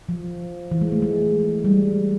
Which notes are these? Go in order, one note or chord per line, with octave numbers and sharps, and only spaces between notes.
F3
E3
G#3
A3
G#3
G3